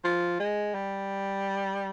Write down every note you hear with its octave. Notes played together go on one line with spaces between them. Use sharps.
F3
G#3
G3